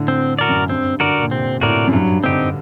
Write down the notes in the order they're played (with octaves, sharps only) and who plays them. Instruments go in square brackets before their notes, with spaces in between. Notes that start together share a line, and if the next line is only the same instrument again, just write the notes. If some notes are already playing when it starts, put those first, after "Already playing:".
Already playing: [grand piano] A2 D3
[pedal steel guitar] C4
F#4 A#4 D5
[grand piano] F#2
[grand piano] G2 [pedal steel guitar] C4
[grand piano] D3 [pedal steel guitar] F#4 A#4 D5
[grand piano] A#2
[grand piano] C3 [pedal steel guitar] C4
[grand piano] A2 [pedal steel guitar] F#4 A#4 D5
[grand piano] F#2
[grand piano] G2 [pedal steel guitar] F#3
[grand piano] D3 [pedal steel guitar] C4 D#4 G4